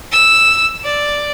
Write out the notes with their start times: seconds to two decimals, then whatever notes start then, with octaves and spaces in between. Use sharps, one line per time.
0.12 E6
0.84 D5